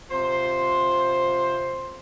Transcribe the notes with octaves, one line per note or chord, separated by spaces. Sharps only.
C3 F4 C5